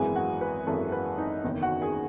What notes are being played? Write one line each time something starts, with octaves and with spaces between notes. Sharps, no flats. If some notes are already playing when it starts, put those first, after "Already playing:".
Already playing: G#1 F#2 E3 G#3 B3 G#4 G#5
F#4 F#5
B4
G#1 F#2 E3 G#3 B3 A4
B4
D#4 D#5
F#1 E2 D#3
F#4 F#5
G#4 G#5